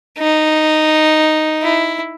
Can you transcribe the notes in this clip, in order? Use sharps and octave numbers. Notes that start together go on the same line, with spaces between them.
D#4
E4